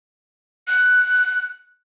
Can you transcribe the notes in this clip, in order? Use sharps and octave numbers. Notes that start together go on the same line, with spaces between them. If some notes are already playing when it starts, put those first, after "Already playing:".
F#6